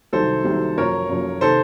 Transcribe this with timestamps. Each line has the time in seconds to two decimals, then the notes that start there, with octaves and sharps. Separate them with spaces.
0.13 C2 C3 D#3 F#3 A4 C5
0.45 C2 C3 D#3 F#3
0.77 F#1 F#2 F3 A#4 C#5
1.09 F#1 F#2 F3
1.41 C3 D#3 A4 C5